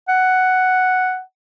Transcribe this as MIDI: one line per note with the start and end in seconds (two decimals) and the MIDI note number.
0.08 1.21 78